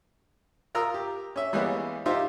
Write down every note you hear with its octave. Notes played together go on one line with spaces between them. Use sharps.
F4 A#4 A#5 D#6 E6
G4
C#4 E5
E3 G3 G#3 A#3 B3 C#4
D#4 F4 G4 C5 E5